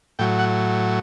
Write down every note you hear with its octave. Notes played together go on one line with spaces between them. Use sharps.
A2 F#3 G5
F#5